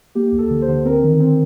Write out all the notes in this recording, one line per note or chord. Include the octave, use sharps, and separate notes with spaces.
A#3 G4
D2
A4
D3
C5
D3
C4 A#4
D#3
C4